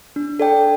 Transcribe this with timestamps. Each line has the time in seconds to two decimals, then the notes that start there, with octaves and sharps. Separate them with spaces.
0.16 D4
0.39 A4 D5 G5